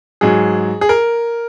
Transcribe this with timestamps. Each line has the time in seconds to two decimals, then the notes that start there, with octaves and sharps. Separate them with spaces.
0.21 G#2 F#3 G#4
0.81 G#4
0.89 A#4